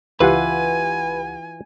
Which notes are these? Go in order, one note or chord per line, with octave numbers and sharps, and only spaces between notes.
C#2 E3 F4 G4 B4 F#5 G#5